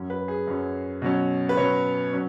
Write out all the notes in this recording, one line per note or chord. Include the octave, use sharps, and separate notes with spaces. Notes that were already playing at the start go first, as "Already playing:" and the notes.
Already playing: F#2 F#3 C#4
B4
G#4
F#2 F#3 C#4
B2 F#3 C#4
B4
B2 F#3 C#4 C#5
F#3 C#4